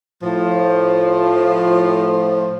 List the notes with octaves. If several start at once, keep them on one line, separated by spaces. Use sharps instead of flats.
A2 F3